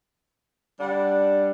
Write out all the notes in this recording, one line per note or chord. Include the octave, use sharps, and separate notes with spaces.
G3 D4 F#5